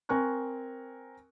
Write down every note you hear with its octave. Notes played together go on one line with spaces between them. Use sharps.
C4 A#4 G#5 C#6 F#6